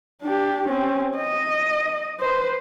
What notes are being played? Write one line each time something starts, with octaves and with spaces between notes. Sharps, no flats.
D4 G4
C4 C#4
D#5
B4 C5